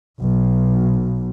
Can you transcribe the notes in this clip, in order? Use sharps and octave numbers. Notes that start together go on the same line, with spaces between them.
B1